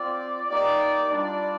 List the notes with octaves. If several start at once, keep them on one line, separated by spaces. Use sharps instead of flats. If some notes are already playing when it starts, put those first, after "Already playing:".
Already playing: C4 F4 D5
A#3 D#4 G4 D5
G3 D4 F4 D5